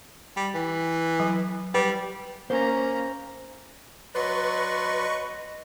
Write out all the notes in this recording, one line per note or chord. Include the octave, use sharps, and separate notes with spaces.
G3
E3
F#3
G3 B4
A#3 C#4 C5 A#5
F#3 B4 D5 D#5 C6 C#6